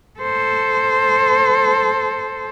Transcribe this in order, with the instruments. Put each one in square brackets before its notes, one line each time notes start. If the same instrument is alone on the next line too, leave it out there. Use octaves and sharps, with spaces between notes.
[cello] A4 C5